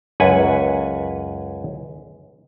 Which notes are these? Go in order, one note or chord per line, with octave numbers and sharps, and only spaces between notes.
C#2 F#2 B4 F#5 G#5